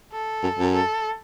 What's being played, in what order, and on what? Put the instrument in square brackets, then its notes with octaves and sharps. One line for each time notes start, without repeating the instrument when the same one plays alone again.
[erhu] A4
[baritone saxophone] F#2
F#2
[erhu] A4